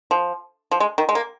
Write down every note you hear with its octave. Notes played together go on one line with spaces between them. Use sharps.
F3
F3
G#3
D#3
G#3
A#3